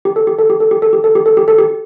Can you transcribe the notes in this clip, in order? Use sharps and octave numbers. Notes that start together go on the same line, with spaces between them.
G4
A4
G4
A4
G4
A4
G4
A4
G4
A4
G4
A4
G4
A4
G4